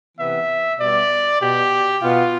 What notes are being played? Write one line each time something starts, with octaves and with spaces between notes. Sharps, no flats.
C3 E3 B3 E5
B2 G3 B3 D5
B2 B3 G4
B2 B3 F4